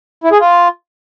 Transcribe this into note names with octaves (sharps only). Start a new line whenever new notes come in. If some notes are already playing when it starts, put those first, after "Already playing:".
E4
G#4
F4